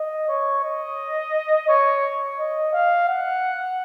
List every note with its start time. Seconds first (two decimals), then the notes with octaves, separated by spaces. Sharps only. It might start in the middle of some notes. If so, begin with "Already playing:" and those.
Already playing: D#5
0.28 C#5
0.64 D#5
1.68 C#5
2.39 D#5
2.73 F5
3.08 F#5